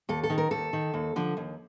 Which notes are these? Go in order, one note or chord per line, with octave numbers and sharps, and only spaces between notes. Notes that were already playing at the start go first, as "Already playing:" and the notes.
D#2 A4
A4
D#3
A#4
D#2 A4
D#3
D#2
D3 F3
D#2